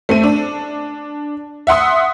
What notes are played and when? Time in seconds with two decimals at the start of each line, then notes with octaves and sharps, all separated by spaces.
0.09 A3 C4 D#7
0.23 D4
1.67 E5 F#5 C6 D#6